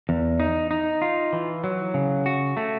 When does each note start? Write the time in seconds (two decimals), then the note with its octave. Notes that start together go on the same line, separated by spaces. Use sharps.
0.09 E2
0.40 D#4
0.71 D#4
1.02 F4
1.33 E3
1.64 F#3
1.94 C#3
2.26 F#4
2.57 A3